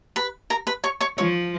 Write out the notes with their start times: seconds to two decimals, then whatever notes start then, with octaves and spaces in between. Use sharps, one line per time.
0.16 B4 B5
0.50 A#4 A#5
0.67 B4 B5
0.84 C#5 C#6
1.01 C#5 C#6
1.18 F3 C#5 C#6